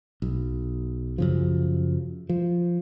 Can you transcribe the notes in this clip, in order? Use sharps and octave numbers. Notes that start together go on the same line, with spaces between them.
B1
F#2 C#3 F3
F3